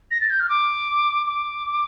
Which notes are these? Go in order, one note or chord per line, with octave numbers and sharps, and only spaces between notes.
A#6
A6
G6
F6
D6
D6